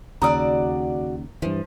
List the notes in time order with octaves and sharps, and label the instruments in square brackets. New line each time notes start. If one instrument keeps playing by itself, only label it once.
[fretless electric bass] D#2 C#3 [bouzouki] F#4 D5 F#5 [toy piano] A#5 D#6 E6
[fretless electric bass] G2 E3 [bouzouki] F3